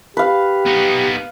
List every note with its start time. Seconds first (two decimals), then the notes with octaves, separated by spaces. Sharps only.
0.17 G4 B4 F5
0.66 B3 D#4